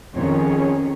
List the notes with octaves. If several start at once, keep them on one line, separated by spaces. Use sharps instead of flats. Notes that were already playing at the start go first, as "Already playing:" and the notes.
F2 D#3 C#4 G#4 C#5